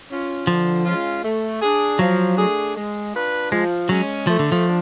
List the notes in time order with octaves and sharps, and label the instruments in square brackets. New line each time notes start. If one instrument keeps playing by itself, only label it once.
[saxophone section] C#4 F4
[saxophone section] D3 [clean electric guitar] F3
[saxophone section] G#3 C#4 F4
A3
D4 G#4
[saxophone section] F3 [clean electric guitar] F#3
[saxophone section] A3 D4 G#4
G#3
D4 F4 B4
[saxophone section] F3 [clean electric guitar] G#3
[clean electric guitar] F#3 [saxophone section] G#3 C#4
[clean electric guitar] F3 [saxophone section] A3
[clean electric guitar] D3
F3
[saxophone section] D4